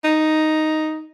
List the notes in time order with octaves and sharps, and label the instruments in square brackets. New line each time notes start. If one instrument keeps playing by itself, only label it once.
[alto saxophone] D#4